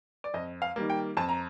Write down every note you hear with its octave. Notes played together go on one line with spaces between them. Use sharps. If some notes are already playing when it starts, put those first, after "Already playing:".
D5
F2 D#5
F5
D#3 G3 A#3
G5
F2 A5
A#5